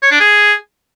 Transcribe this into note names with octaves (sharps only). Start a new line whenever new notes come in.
C#5
D4
G#4